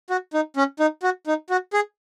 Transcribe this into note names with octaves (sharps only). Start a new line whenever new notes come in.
F#4
D#4
C#4
D#4
F#4
D#4
F#4
G#4